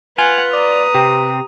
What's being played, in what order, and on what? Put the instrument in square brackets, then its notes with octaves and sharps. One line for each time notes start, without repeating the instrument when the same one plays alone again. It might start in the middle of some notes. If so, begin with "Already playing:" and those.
[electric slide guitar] F4 [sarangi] B4 [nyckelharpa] F#5 [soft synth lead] G#5
[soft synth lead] D5 [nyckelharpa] A#5 D#6
[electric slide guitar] C3 C4 [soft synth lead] G4